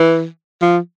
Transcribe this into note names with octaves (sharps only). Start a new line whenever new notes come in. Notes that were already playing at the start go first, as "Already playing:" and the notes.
Already playing: E3
F3